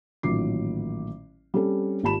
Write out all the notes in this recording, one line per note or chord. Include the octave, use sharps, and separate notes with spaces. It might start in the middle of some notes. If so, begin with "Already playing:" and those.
A1 A#2 D#3 F#3 D6 C7
G3 C4 C#4 A4
G#1 F4 G4 A5 B5 E7